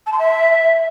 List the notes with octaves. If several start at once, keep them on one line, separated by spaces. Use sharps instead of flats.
A5
C6
E5